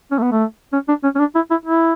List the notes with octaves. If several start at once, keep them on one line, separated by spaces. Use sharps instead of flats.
C#4
A3
B3
A3
C#4
D4
C#4
C#4
D4
E4
E4
E4